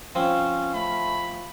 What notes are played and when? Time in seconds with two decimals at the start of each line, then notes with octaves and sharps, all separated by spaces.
0.15 F3 C4 C#4
0.75 A3 B5